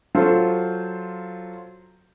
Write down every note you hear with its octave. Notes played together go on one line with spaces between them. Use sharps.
F#3 F4 A4 C5